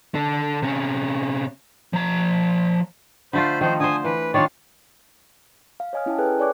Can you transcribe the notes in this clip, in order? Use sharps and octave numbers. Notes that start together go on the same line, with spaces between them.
D3 A4
C3 C#4
F3 A#5
D3 A3 F4 C5 B5
D#3 F3 D#4 C5
D3 C5 G#5 D#6
E3 B4
D#3 D4 F4 C#5 D5
F5
C#5 D#5 G#5 D#6 F6
C#4 E4 D#5 G5 A5
G#4 A4 B4 G5 G#5 F#6
C#5 D5 G#5 C#6 D6 F#6